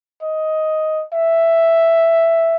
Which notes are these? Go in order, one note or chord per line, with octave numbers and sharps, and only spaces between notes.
D#5
E5